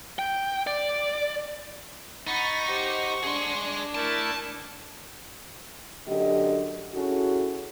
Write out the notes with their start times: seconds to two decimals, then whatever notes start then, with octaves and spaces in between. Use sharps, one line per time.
0.19 G5
0.67 D5
2.27 D#4 F#5 B5 C#6 A6
2.66 G4 C5
3.23 D4 G#4 C6
3.95 A3 E4 A#4 A5
6.07 F#2 D3 A3 G4 D#5
6.94 C#4 E4 F#4 G#4 A4